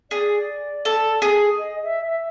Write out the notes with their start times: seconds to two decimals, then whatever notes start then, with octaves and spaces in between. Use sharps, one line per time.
0.11 G#4 D5
0.85 A4
1.22 G#4
1.59 D#5
1.84 E5
2.08 E5